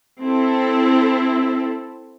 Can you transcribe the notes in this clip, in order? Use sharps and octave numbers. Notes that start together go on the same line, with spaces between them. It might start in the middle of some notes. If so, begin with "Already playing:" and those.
C4 E4 A4